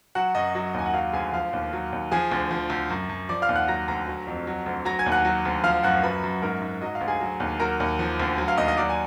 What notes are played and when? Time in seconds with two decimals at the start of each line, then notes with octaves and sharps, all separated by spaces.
0.15 F#3 F#4 F#5
0.35 F#2 D#5
0.55 F#3
0.74 D#2 G#5
0.86 F#5
0.94 F#3 F5
1.13 D2 G#4 G#5
1.33 F3 F5
1.53 D#2
1.73 F#3
1.92 D#2
2.11 F3 G#4 G#5
2.31 D2
2.51 F3
2.70 D2
2.90 F#2
3.09 F#2
3.29 F3 D5 D6
3.42 F5 F6
3.49 D#2
3.55 F#5 F#6
3.68 F#3 A#5 A#6
3.88 D2 A#5 A#6
4.08 F#3
4.27 F2
4.47 F#3
4.66 D2
4.85 F#3 A#5 A#6
4.99 G#5 G#6
5.06 D#2
5.12 F#5 F#6
5.25 F#3
5.45 D2
5.64 F3 F5 F6
5.83 F#2 F#5 F#6
6.03 F#3 B4 B5
6.24 F#2
6.42 G#2 A#4 A#5
6.62 G#2
6.82 F#3 D#5
6.95 F5
7.01 D2
7.08 G#4 G#5
7.21 F#3
7.40 D#2
7.60 F#3 A#4 A#5
7.80 D#2
7.99 F3
8.20 D2
8.38 F#3
8.48 F5 F6
8.58 D#2 D#5 D#6
8.68 D#5 D#6
8.77 F#3 D5 D6
8.89 G#5